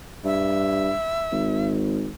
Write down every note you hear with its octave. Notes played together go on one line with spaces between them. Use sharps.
G2 E5
G#1